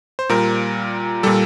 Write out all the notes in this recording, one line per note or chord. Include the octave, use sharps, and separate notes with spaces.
C5
A#2 G3 A#4
A#2 G3 A4